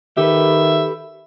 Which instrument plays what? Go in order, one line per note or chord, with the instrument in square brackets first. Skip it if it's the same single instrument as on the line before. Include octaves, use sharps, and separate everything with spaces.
[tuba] D#3 [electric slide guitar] G4 A4 B4 [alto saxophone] E5